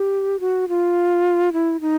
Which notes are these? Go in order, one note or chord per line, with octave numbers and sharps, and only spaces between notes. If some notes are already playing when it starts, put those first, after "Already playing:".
Already playing: G4
F#4
F4
E4
D#4